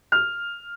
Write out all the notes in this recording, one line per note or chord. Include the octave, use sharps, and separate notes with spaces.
F6